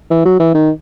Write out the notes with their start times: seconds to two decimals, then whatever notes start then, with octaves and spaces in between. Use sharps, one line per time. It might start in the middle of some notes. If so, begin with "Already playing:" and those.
0.10 E3
0.25 F#3
0.40 E3
0.54 D#3